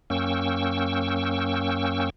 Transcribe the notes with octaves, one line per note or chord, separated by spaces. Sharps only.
F#2 A#3 C#4 G5 C#6 E6